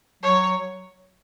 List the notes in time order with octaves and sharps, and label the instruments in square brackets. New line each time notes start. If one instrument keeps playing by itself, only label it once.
[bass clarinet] F#3 [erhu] C#5